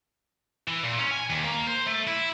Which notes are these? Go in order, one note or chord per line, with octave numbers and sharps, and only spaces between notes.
E3
A#2
C#4
G#5
D#2
A#3
C5
A3
E4